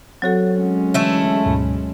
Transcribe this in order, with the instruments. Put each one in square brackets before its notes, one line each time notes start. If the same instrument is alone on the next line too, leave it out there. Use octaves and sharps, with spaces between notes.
[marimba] F#3 F#4 A4 [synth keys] C4 C#5 F#5
[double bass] G#3 C#4
[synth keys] D3 E3 [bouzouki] A3 E4
[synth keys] D2 G#2 B2